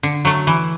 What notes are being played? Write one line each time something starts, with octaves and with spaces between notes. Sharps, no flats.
D3
F#3 A3
E3